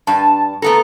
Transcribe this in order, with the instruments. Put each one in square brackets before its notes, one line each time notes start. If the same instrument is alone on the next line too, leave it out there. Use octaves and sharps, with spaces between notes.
[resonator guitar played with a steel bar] G2 [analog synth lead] A5
[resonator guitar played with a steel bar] A3 B3 A4 [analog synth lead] A#5